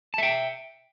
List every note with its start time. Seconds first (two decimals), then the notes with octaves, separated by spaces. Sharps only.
0.14 A5
0.18 E5
0.23 G5